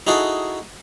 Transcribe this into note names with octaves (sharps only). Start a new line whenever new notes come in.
D#4 E4 F#4 G#4 A4